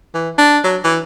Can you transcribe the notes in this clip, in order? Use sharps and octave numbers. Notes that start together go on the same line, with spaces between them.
E3
D4
F#3
E3